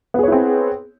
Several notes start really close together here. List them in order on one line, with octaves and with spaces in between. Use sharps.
B3 G#4 C#5 E4 C4